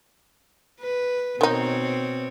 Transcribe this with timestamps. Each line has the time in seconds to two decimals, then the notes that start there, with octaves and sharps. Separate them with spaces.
0.82 B4
1.41 B2 D#3 C4 D#4 C#5